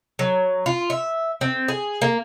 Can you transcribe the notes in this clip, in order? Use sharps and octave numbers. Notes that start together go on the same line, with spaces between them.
F#3
F4
E5
C4
G#4
A#3